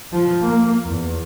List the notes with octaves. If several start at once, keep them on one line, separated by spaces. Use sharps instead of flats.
F3
A#3
E2